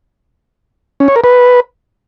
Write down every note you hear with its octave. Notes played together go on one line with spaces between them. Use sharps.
C#4
C#5
A#4
B4